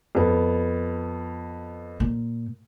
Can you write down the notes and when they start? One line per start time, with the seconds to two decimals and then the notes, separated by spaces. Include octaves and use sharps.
0.15 F2 B3
2.00 A#2